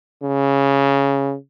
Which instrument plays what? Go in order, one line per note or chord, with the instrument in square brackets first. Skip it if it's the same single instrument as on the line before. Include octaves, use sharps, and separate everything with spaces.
[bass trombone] C#3